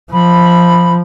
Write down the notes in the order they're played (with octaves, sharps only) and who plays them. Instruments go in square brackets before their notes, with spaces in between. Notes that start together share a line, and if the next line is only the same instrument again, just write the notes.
[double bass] F3 [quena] B5